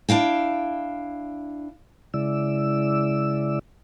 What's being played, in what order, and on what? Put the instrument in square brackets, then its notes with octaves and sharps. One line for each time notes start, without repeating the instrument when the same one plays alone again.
[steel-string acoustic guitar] D4 E4 F5 G5
[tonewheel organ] C#3 G#3 E4 D5 E6